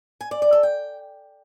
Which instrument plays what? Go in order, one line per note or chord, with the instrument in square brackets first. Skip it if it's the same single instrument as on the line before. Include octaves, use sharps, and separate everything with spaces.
[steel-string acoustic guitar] G#5
D5
D5
A4
G5